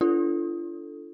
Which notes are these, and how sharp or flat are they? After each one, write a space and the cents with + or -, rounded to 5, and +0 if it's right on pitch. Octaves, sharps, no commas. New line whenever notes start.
D4 -5 F4 -35 A4 +0